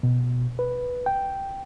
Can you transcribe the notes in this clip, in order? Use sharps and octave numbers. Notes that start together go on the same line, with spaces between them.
B2
B4
G5